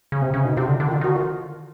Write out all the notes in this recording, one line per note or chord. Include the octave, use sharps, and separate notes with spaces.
C#3
C3 C4
C#3 C#4
B2 D#4
C3 F4 G4
D3
D3
D#3
D3 F4
D#3
D3 F#4
D#3 F4